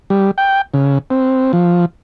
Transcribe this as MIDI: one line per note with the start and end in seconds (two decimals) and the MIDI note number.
0.10 0.31 55
0.38 0.61 79
0.74 0.98 49
1.10 1.52 60
1.53 1.85 53